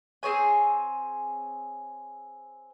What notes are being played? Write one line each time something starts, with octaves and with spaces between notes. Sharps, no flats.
C4 G#4 C#5 G#5